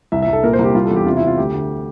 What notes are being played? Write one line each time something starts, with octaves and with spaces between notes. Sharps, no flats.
C2 E5
E5
C2
A4
A#2 A#4
C5
C2
G4
G3 F4
E2 A4
G4
C3 F4
E4
C3
F4
D2 G4
D2